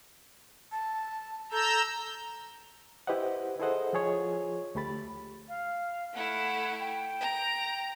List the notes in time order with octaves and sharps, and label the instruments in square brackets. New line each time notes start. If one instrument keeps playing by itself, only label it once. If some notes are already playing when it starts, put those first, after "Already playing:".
[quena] A5
[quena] A4 [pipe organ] A#5 E6 G6
[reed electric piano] E4 G4 B4 C5 D#5 F#5
E4 G#4 A4 C5 D#5 F#5
F3 F4 G#4 C#5
D2 A3 G4 B5 A6
[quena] F5
[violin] A3 E4 [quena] F#5
[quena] G5
[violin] A#5